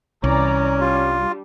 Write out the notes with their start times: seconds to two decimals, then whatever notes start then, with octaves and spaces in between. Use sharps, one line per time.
0.24 C2 E3 C#4 D5 A#5
0.81 G3 D4 F4